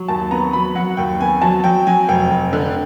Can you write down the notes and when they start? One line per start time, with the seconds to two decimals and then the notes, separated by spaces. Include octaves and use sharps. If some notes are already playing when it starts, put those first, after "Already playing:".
Already playing: F#3
0.08 D#2 A5
0.31 B3 A#5
0.53 F#3 B5
0.75 F#3 F#5
0.97 D#2 G5
1.20 B3 G#5
1.41 F#3 A5
1.64 F#3 G5
1.87 F#3 G#5
2.08 F1 G5
2.30 F1
2.53 D3